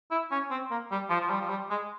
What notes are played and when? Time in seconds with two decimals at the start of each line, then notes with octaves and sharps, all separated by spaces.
0.11 E4
0.32 C#4
0.51 C4
0.71 A#3
0.91 G3
1.10 F3
1.21 F3
1.30 G3
1.41 F3
1.50 G3
1.70 G#3